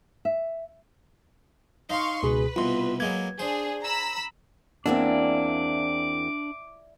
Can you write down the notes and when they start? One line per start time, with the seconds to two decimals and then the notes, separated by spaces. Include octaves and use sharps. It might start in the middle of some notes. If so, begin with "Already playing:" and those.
0.25 E5
1.90 D#4 F5 C6 C#6
2.23 C#2 B2 G#4 B4
2.56 C2 B2 F4 C6
3.00 F#3 G#3 A#3 G#6
3.39 D4 G#4 C5
3.82 A#5 B5 E6
4.86 E2 A#3 C4 D4 E4 D5 G#5 D6